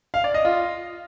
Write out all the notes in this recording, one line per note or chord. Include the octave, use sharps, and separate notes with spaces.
F5
D5
D#5
F4